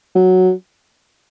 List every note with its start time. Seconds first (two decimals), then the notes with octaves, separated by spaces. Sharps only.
0.15 F#3